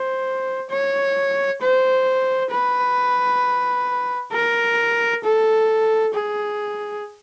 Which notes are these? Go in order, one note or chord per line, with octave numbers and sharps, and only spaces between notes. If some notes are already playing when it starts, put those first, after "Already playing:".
Already playing: C5
C#5
C5
B4
A#4
A4
G#4